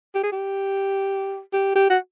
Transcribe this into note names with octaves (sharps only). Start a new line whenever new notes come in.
G4
G#4
G4
G4
G4
F#4